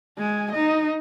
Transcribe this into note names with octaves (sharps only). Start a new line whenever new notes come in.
G#3 G#5
D#4 D#5